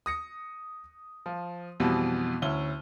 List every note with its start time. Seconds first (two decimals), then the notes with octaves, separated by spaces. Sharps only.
0.06 D#6 A#6 C#7
1.26 F3
1.80 F2 B2 E3 G3 B3
2.42 D2 C#4 E4 G7